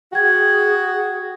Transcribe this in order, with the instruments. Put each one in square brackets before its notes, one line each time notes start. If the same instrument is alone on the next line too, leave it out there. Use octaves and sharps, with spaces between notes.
[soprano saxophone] F#4 [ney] G#4 [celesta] G5 G#6